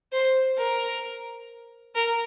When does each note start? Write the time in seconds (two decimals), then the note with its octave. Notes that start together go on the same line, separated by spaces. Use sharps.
0.12 C5
0.57 A#4
1.95 A#4